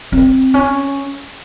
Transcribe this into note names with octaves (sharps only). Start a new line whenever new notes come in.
C4
C#4